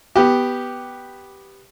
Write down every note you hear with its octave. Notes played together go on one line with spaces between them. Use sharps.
B3 G4